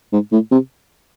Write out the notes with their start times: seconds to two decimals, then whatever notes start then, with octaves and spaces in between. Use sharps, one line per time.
0.13 G#2
0.32 A2
0.51 C3